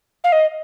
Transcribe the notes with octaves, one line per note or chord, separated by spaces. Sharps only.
F5
D#5